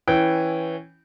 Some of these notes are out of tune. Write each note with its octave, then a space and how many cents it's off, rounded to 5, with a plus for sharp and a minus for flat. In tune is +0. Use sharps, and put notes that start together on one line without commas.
E3 +0 C#4 +0 G5 -15